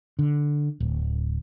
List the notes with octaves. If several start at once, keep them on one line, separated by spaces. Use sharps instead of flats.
D3
D1